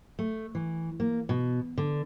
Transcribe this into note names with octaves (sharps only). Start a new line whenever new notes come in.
A3
E3
A#3
B2
D3